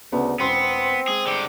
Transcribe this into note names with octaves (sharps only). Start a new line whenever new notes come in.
D2 C#3 B3
E1 B3 C4 C6 C7
G#3 G#4
D3 G4